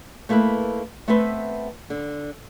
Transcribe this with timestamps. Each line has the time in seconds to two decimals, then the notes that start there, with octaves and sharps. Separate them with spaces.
0.29 A3 A#3 E4 A4 B4
1.08 A3 B3 C4 B4 E5
1.90 D3